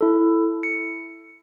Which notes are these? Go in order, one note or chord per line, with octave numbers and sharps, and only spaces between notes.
E4 A4
C#7